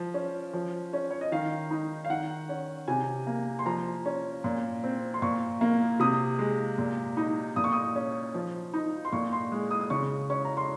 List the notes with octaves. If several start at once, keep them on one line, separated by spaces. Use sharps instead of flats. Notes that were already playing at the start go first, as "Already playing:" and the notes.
Already playing: F3
C#4
F3
C#4
C#5
D#5
D#3 F5
D#4
F5
D#3 F#5
C#4
C3 G#5
A#3
C6
F3 A#5
C#4
A#2
C4
C6
A#2 C#6
A#3
C3 D#6
G#3
A#2
D#4
A#2 D#6
C#6
D#6
C#4
F3
D#4
C6
A#2 C#6
C6
G#3
D#6
D#6
C#3 C#6
C#4 C#6
A#5
C6